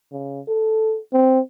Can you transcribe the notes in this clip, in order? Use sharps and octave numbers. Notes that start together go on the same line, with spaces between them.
C#3
A4
C4